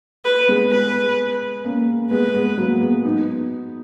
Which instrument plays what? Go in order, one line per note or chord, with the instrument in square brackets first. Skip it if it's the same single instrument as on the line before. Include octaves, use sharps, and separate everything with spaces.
[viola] B4
[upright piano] G#3 B3
[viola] B4
[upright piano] A#3 C#4
[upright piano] G#3 B3 [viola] B4
[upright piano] G#3 B3
F#3 A#3
G#3 B3
B3 D#4